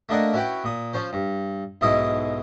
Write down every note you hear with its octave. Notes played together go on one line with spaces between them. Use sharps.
A3 A#3 D4 A#4 D#5 F#5
C#4 E4 F#4 B4 F#5 G5
A#2 D#6
F3 C#4 C5
G2
B1 G#2 B2 E4 D#5 D#6